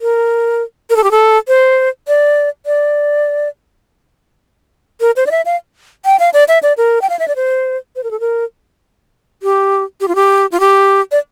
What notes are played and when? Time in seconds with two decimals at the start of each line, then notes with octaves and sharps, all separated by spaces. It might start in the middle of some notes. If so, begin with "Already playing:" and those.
0.01 A#4
0.90 A#4
0.96 A4
1.04 G4
1.11 A4
1.48 C5
2.08 D5
2.66 D5
5.01 A#4
5.16 C5
5.26 D5
5.31 E5
5.45 F5
6.05 G5
6.19 F5
6.33 D5
6.48 E5
6.63 D5
6.77 A#4
7.02 G5
7.09 F5
7.19 E5
7.28 D5
7.36 C5
7.96 C5
8.03 A#4
8.11 A4
8.20 A#4
9.43 G4
10.00 G4
10.08 F4
10.15 G4
10.52 F4
10.60 G4
11.11 D5